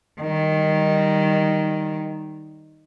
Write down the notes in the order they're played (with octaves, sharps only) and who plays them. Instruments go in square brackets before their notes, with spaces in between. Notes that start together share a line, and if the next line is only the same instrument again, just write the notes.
[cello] D#3 G3